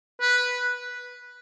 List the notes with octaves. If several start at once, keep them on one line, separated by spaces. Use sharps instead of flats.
B4